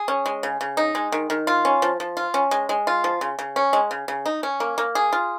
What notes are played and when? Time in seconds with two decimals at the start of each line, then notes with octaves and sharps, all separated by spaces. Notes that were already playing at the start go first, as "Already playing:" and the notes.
Already playing: G#4
0.08 C#4
0.26 G#3
0.43 C#3
0.61 C#3
0.77 D#4
0.95 G#3
1.12 D#3
1.30 D#3
1.47 F4
1.65 C#4
1.82 F3
2.00 F3
2.17 F4
2.34 C#4
2.51 G#3
2.69 G#3
2.87 F4
3.04 F3
3.21 C#3
3.39 C#3
3.56 C#4
3.73 G#3
3.91 C#3
4.08 C#3
4.26 D#4
4.43 C#4
4.60 A#3
4.78 A#3
4.95 G#4
5.13 F4